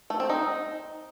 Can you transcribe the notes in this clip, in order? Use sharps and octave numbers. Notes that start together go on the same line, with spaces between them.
A3
C4
D#4